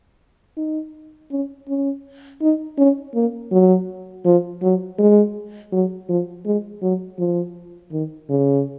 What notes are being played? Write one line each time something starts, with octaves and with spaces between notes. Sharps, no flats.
D#4
C#4
C#4
D#4
C#4
A#3
F#3
F3
F#3
G#3
F#3
F3
G#3
F#3
F3
D#3
C#3